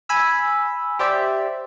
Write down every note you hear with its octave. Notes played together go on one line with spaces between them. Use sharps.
G#5 B5 E6
G4 C5 D5 E5